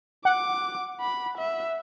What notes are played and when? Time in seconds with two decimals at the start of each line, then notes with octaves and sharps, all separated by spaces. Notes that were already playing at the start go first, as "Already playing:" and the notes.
0.25 F#5 D6
1.00 B5
1.38 E5